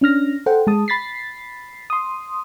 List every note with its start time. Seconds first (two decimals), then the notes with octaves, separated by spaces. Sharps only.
0.01 C#4 D4 F6 A#6
0.46 A4 C5 F#5 G5
0.67 G#3 A5 D#6
0.88 B5 A6 B6 C7
1.90 C6 D#6